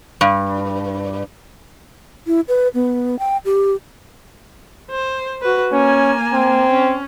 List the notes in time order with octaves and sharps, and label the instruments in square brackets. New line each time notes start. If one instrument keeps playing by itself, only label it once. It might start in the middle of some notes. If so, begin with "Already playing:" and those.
[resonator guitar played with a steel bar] G2
[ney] E4
B4
B3
G5
G4
[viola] C5
F#4 B4
[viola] A#3 G#5 [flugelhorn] C#4
[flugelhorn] C4
[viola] C#4